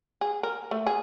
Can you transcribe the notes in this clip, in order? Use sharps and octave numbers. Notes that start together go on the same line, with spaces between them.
G#4
A#4
A3
G#4